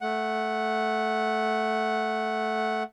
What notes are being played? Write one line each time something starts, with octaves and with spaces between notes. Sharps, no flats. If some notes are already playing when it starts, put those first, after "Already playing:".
A3 F#5